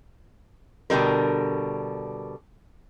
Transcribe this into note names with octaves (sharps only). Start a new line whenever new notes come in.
B2 D3 G3 A#4